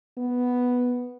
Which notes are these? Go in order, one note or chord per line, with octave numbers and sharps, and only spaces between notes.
B3